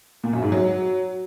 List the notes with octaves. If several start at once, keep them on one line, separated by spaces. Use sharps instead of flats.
A#2
F#2
G#2
F#3